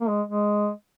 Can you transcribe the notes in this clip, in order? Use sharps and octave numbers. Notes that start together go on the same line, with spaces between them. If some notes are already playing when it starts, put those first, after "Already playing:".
A#3
G#3
G#3